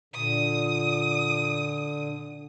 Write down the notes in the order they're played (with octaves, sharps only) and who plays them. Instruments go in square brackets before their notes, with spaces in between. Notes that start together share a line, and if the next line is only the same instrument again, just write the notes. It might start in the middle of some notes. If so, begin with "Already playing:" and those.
[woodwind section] A#2 [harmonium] D3 [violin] D#6